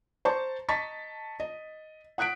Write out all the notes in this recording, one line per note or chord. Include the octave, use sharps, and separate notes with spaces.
C5 A5 A#5 C#6
D#5 A5 A#5 C#6 A6 B6
D#5
F#5 D#6 F#6 B6 D7